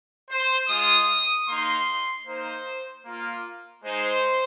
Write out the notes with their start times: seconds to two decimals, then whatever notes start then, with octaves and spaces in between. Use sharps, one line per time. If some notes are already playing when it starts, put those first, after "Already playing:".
0.31 C5
0.69 G#3 F4 D#6
1.48 A#3 D#4 C6
2.27 A#3 D#4 C5
3.06 A#3 F4
3.84 G#3 D#4 C5